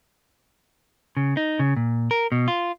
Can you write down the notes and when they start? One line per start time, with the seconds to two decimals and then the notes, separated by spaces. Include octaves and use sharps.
1.17 C#3
1.37 D#4
1.59 C#3
1.77 A#2
2.11 A#4
2.32 B2
2.48 F4